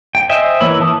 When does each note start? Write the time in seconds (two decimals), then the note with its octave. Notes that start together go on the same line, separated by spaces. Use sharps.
0.15 G5
0.29 C5 D#5 E5 G5 G#5
0.60 E3 A#3 C#5 B5 E6
0.80 E3 A5 D#6